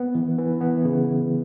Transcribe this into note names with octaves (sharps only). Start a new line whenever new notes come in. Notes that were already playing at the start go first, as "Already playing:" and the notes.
Already playing: B3
E3
E3
B3
C#3